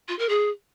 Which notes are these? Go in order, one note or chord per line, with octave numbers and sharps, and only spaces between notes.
F4
A#4
G#4